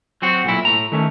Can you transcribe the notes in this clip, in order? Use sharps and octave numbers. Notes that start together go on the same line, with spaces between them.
F#3 C4 F#4
B1 A#2 E4
A2 A#5
D#3 A3 C#4